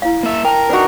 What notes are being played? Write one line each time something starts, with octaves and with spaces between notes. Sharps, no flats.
E4 F5
A#3 E5
A#4 G5 A5
D4 D#4 F#4 B4